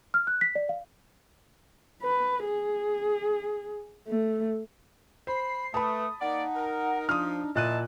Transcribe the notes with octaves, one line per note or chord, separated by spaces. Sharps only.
F6
F#6
B6
D5
F5
B4
G#4
A3
C5 B5 C7
A3 B4 A5 B5 D#6
A#3 D#4 D5 F#5
A#4
F3 D4 D#6 F6
A#2 F3 E4 D#5 A5 F#6 D#7